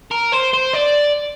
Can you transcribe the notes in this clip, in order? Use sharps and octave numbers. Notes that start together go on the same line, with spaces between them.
A#4
C5
C5
D5